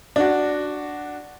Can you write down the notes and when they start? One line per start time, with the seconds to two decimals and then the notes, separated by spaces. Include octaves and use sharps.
0.16 D4 F#4